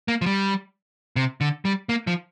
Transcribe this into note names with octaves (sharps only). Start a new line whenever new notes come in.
A#3
F3
G3
C3
D3
G3
A#3
F3